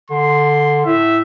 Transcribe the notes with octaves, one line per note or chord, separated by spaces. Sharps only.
D3 C6
A2 E5